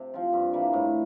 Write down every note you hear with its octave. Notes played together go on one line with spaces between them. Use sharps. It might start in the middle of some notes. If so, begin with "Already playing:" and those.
Already playing: C3 D4
F3 C4 F4
G2
E3 G3 A#3
A2